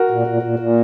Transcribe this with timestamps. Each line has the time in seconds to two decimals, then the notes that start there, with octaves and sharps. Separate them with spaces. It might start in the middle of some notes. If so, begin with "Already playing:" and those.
Already playing: F#4 A#4
0.11 A#2
0.27 A#2
0.42 A#2
0.59 A#2